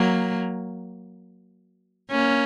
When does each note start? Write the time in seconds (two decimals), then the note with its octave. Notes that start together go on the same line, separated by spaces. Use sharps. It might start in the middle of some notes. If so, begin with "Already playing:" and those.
Already playing: F#3 A#3
2.11 A#3 C#4